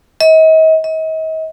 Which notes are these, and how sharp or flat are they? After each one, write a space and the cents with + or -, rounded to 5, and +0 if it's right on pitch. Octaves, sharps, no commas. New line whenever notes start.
D#5 +40
D#5 +40